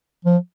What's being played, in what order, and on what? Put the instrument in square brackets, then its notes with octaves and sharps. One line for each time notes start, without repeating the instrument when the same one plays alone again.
[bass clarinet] F3